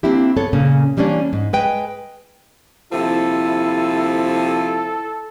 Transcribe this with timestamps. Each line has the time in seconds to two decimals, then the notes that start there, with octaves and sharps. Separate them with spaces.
0.03 A#3 C4 D4 E4 G4
0.36 G2 B3 A4 C#5
0.53 A#2 C#3 A#3 C#4
0.97 E3 G3 A#3 C#4 D4
1.33 G#2
1.53 G#3 B4 G5
2.93 D#2 C3 F3 E4 A4